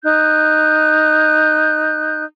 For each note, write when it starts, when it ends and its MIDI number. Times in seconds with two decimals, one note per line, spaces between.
0.04 2.24 63
0.04 2.24 90
0.04 2.24 91